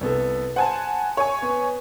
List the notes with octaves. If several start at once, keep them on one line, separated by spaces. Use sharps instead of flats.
C2 B3 A4
C5 F#5 G#5 A5
C#5 G#5
B3